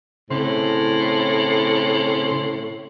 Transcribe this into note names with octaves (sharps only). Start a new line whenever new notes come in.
A2 C#3 C4 C6